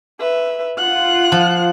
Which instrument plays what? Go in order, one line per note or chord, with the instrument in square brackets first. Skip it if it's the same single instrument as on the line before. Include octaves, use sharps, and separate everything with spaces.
[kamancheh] B4 E5
[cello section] F4 [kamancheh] F#5 F#6
[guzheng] F3